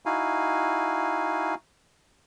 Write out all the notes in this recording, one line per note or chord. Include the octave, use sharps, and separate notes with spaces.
D#4 E4 F#4 F5 G#5